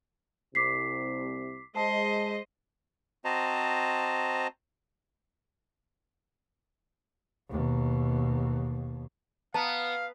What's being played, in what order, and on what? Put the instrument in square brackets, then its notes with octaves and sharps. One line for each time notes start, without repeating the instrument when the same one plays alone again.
[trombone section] C2 C3 [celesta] D6 B6 C7
[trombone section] G#3 [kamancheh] C5 D#5 [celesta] A5
[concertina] C4 F#4 C5 D#5 A5 A#5
[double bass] D#2 B2
[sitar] B3 [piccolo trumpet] F5 [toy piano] A5 A#5